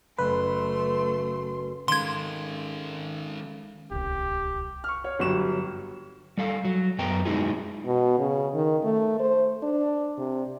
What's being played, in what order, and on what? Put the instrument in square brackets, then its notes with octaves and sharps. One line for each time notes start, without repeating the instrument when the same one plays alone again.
[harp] F#1 [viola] A3 C6 [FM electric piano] B4
[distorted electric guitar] D#3 G#3 [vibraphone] C#4 A4 F5 [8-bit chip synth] C6 G#6
[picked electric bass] D1 C2 [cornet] G4
[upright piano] C#6 F6
C#5
G1 F#3 G3 C#6 E7
[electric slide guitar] G3 A4 F5
F#3
F#2 B3 G5 A#5
G#3 D#4 E4 F#4 G#4
[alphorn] B2
C#3
D#3
A3
C5
D4
C3